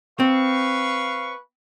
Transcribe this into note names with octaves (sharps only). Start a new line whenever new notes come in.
C4 B4 F5 C#6